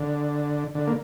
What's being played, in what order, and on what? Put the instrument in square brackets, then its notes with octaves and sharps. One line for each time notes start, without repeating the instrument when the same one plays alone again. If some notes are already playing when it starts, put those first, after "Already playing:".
Already playing: [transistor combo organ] D3
D3
A#3